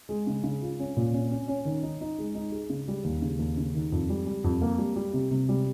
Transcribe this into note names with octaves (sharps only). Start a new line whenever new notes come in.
G#3
C#3
C#3
F4
C#4
A#2
C#4
C#4
C#4
D#3
D#4
D#4
G#3
D#4
G#4
C#3
G3
D#2
C#3
D#2
C#3
D#3
F2
G3
G3
F2
A#3
G3
G3
C3
C3
G3